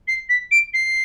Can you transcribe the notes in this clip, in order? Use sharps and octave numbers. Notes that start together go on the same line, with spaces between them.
C7
B6
D7
C7